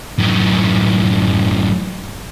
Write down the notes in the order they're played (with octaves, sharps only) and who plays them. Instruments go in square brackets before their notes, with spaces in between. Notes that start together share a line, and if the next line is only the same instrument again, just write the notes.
[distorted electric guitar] F#2 A2